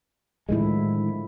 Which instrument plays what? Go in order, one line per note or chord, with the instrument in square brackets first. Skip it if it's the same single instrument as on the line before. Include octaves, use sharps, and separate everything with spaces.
[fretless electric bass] A2 D#3 G#3 [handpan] D3 F3 E4